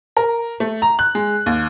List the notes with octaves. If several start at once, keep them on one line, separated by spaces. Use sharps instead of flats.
A#4
A3
A#5
F#6
G#3
D#2